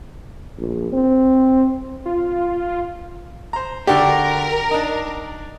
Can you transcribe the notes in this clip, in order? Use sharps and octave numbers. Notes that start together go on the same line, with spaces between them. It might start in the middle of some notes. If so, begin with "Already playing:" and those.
A#1
C4
F4
C5 A#5
D3 F#4 G4 A#4 D5
D4 D#4